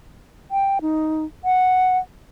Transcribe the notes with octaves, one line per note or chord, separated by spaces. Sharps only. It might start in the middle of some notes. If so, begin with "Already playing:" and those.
G5
D#4
F#5